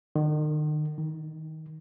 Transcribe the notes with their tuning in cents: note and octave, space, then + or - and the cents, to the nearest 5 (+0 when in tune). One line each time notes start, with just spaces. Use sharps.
D#3 -40
D#3 +20